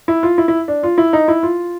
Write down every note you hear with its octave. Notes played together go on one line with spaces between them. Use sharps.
E4
F4
E4
E4
D4
F4
E4
D#4
E4
F4